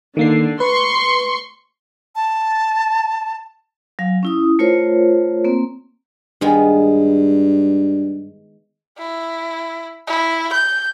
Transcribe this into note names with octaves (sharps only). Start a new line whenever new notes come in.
D3 D#3 A#3 C7
B4 C6 C#6
A5
F#3 F5
C#4 E4 D#6
A3 F4 A#4 C5 C#5
A#3 C4
G2 D#3 G#3 B3
E4
E4
G6